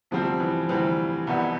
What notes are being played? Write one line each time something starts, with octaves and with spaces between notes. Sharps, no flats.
D2 C3 F3 G3 C4
E3
D2 C3 E3 G3 C4
C2 B2 B3 E4